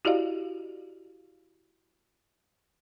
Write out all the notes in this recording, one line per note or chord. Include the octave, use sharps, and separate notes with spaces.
E4 F#4 G4 D5 D#5 F5